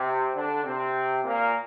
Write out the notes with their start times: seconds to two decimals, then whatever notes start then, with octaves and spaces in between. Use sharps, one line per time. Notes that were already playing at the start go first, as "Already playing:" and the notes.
Already playing: C3 C4
0.34 D3 D4
0.64 C3 C4
1.25 A#2 A#3